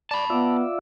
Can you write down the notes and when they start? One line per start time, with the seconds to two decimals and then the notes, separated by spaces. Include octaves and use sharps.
0.11 D5 A5 B5
0.30 B3 F4 D5 E5